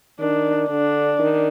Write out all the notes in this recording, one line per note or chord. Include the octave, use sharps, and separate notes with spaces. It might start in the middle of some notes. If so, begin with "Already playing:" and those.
D#3 D4
D3 D4
D#3